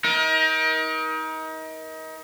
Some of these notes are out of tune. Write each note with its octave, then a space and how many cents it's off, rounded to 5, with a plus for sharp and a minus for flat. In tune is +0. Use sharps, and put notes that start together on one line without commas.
D#4 +30 A#4 +30